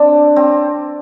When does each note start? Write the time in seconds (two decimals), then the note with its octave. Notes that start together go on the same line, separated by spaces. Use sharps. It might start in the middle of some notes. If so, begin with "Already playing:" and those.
Already playing: C4 D4
0.36 C4